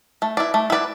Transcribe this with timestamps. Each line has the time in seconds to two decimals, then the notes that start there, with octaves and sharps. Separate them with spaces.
0.22 A3
0.37 E4 B4 D5
0.54 A3
0.70 E4 B4 D5